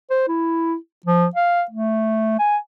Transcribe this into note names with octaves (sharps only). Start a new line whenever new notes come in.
C5
E4
F3
F5
A3
G#5